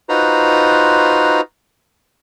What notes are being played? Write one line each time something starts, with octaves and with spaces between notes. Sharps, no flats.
D#4 F4 F#4 B4 C5 A#5